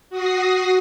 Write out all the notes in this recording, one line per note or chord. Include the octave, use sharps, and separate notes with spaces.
F#4 D#6 A#6 C7